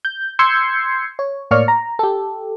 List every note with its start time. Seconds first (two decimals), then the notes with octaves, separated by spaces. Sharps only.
0.05 G6
0.39 C6 E6 G6 G#6 C7 C#7
1.19 C#5
1.51 A2 A#3 C#5 D5 C#6 F6
1.68 A#5
1.99 G4 A4